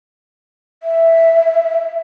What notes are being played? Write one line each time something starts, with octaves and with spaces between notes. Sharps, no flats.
E5